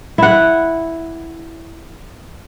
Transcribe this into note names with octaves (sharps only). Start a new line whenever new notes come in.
E4 F#5